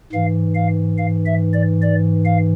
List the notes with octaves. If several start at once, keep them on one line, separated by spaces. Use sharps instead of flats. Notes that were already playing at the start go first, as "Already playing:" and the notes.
G#2 E3 F5
F5
F5
E5
D5
D5
F5